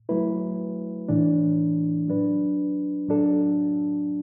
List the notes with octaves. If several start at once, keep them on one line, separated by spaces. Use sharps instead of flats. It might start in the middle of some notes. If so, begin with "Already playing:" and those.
F#3 A3 E4 B4
A2 E3 D4
F#3 D4 B4
A2 F#3 D4 A4